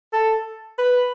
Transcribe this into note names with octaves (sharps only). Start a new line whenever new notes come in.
A4
B4